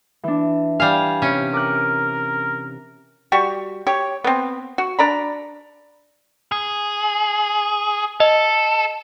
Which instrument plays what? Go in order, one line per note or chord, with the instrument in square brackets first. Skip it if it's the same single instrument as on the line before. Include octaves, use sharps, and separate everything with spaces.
[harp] E3 D4
[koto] G3 F5 [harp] G#5
[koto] C3 C#4
[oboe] A#4 [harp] D6 F#6
[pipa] G3 F#4 G4 C#6
G4 C#5
B3 C4
F#4
D4 D5 A#5 B5
[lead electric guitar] G#4
[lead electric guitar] A4 [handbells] D#5